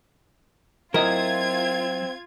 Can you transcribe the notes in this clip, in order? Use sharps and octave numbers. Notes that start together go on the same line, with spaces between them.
F#3 C4 E4 F4 A#4 D#5 G#6